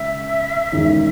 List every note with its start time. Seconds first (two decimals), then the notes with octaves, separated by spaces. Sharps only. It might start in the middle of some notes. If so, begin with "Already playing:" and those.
Already playing: C#3 G#3 E5
0.72 E1 E2 D#3 G#3 C#4